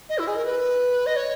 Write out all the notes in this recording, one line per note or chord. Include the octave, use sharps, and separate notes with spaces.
D#5
E4
G#4
A#4
B4
D#5
C#5